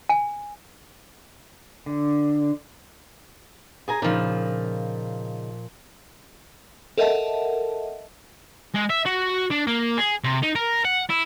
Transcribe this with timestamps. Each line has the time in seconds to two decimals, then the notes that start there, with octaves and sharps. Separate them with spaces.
0.09 G#5
1.86 D3
3.88 G#4 G#5 A#5
4.02 A#2 C#3 F3 D#4
6.98 A4 A#4 D#5 E5 F#5 A5
8.74 G#3
8.89 E5
9.05 F#4
9.50 D4
9.67 A#3
9.98 G#4
10.24 C3
10.43 D#4
10.55 A#4
10.85 F#5
11.09 E4